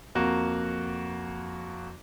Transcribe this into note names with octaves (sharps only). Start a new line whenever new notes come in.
F2 A#3 F#4